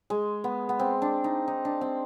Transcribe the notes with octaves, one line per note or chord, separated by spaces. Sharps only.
G#3
B3
B3
C4
D4
D#4
D#4
D4
C4